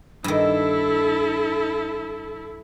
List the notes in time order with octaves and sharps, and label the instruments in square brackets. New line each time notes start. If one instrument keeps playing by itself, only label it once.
[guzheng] G2 D#3 [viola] E4 A4